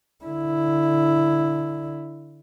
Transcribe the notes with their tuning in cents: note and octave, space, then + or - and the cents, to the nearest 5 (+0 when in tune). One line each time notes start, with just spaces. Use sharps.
D3 +0 E4 +0